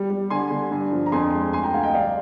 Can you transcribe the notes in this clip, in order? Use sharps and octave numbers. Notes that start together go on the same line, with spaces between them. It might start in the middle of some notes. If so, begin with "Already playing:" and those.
Already playing: G3
G3
D3 G#5 C6
D3
G2
F3
A#5
F2 G#5 C6
G#3
D2 G#5 C6
G5 A#5
D2 F5 G#5
D#5 G5
G2 D5 F5